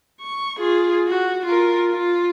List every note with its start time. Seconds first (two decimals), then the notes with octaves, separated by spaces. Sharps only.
0.20 C#6
0.59 F4 G#4
1.07 F#4
1.46 F4 A#4
1.91 F4